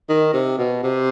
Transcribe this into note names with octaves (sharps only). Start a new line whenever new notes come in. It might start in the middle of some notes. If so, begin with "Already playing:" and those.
D#3
C3
B2
C3